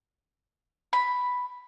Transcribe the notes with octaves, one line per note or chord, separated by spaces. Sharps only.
B5